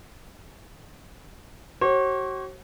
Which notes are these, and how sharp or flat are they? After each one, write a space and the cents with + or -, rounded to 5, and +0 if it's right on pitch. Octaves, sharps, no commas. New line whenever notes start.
F#4 +40 C#5 -45